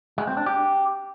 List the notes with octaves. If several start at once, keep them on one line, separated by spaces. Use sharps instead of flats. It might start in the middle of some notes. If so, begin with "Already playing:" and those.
G#3
C4
D4
G4